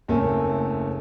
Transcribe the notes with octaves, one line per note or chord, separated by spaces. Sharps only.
F#1 A3 C4 A#4 C#5 G#5